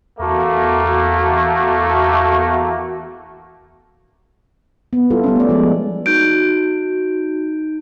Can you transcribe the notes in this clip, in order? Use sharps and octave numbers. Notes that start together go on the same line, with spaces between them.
E2 A3 A#3 F#4
B3
G3 E4 F4 A4
G3 B3 C#4
A3 D5
F3 G#3 B3
D#4 F#4 G6 D7